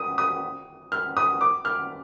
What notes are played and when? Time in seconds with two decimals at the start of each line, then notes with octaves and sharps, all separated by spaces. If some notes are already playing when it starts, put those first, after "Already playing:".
Already playing: D#6
0.18 D#6
0.92 F6
1.17 D#6
1.41 D6
1.65 F6